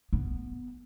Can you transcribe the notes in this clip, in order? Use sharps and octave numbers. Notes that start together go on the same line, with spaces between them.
B3